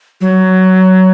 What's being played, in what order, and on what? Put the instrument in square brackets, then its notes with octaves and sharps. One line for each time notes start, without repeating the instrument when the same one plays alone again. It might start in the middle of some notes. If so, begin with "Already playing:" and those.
[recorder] F#3